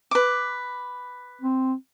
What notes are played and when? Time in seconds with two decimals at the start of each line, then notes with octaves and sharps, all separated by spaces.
0.11 B4 D6
1.41 C4